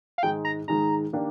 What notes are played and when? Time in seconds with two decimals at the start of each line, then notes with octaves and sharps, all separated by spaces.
0.18 F5
0.23 G#2 D#3 G#3 D#4 G5
0.45 A#5
0.68 G#2 D#3 G#3 D#4 A#5
1.13 D#3 A#3 D4 G4